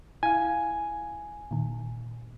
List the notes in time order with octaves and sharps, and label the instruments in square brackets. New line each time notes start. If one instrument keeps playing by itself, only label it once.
[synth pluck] E4 F5 [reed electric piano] G#5
[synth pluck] A#2 D#3